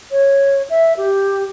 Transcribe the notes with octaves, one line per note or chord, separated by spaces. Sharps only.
C#5
E5
G4